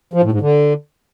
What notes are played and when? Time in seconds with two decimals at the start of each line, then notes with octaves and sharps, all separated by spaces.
0.13 F3
0.23 A2
0.32 G#2
0.41 D3